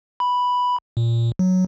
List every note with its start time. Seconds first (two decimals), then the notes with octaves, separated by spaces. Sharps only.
0.20 B5
0.97 A#2
1.39 F#3